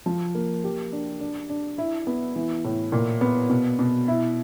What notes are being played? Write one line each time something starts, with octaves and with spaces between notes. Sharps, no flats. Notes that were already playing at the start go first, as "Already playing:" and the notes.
F3
A#3
G4
D4
D4
D4
E4
B3
E3
A2
A#2
B3
B2
B2
E4